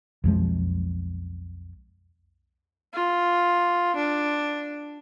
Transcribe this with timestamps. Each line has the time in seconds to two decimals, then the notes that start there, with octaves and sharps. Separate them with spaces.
0.24 B1 F2 F3 G#3
2.93 F4
3.96 D4